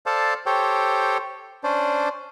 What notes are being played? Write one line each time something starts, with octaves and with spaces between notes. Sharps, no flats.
A4 C5 D5 F5 A5
G4 A4 C5 C#5 G5
C#4 D4 C5 D5